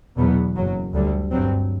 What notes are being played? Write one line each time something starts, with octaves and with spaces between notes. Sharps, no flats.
E2 B2 F#3 B3
F#1 F#2 F#3
D2 D3 G3
G1 G2 F#3 C4